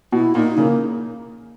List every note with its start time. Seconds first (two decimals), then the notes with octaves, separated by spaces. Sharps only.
0.12 B2 E4
0.35 A#2 D#4
0.57 C#3 A#3